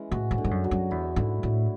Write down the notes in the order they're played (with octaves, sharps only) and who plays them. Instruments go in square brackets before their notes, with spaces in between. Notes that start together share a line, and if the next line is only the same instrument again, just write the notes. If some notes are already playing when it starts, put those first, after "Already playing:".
Already playing: [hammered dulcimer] E3 G#3 C#4
[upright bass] A2 [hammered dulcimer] F#4
[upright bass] G#2
[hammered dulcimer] D3
[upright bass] G#2
F#2
[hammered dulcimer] F#3
[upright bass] F#2
[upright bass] E2 [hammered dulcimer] E4
[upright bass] G#2 [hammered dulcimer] D3
[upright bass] A2 [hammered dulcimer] F#3